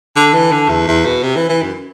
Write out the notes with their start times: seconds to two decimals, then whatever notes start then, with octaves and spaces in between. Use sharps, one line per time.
0.16 D3 A5
0.34 E3
0.52 D3
0.69 E2
0.87 E2
1.05 B2
1.23 C3
1.36 E3
1.49 E3
1.63 F#2